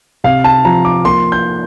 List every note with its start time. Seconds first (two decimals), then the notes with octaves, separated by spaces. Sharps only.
0.24 C3 F5
0.44 A5
0.65 F3 A#5
0.85 D6
1.05 A#3 C6
1.32 G6